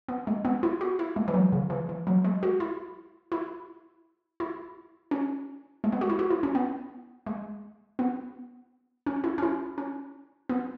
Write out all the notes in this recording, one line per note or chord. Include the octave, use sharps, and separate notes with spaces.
B3
G#3
B3
E4
F#4
E4
G#3
E3
F#3
C#3
E3
E3
F#3
G#3
F#4
E4
E4
E4
C#4
G#3
B3
F#4
E4
F#4
E4
C#4
B3
G#3
B3
C#4
E4
C#4
E4
C#4
B3